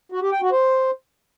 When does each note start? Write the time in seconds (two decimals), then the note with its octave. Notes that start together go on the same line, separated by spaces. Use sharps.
0.12 F#4
0.22 G4
0.32 G5
0.42 F#4
0.52 C5